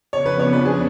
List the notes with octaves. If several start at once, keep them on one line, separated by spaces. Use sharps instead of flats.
F2 C#3 F3 B3 D4 C#5
B4
C#5
B4
G#4